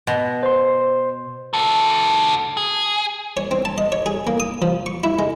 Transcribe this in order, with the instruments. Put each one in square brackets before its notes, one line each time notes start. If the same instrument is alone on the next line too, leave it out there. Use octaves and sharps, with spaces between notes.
[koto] B2
[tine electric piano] C5 C6
[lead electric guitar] F#4 A4
G#4
[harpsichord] C#5
C4
A5
D#5
C#5
G#4
A#3
D#6
F3
C#6
E4
G#3